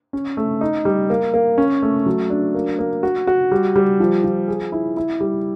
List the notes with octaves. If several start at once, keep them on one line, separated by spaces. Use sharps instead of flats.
C#4
A3
D#4
G3
A#3
A#3
C#4
A3
F#3
D4
A#3
A#3
F#4
F#4
G3
G3
F3
F3
G#4
E4
E4
G3